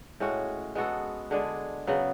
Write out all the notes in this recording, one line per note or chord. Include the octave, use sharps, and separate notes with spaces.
A2 G#3 C#4 F#4
G#3 B3 F#4 A4
D3 G#3 D4 G#4
C#3 F#3 B3